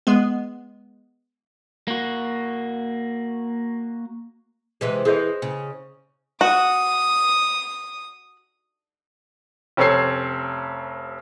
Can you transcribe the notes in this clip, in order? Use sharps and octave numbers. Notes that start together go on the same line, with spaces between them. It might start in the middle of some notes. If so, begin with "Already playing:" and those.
G#3 B3
A#3 F#4
C3 E3 G#3
E3 G#4 C5 D#5
C#3
F#4 D#6
F1 C4 C#4 A4 C#5 C7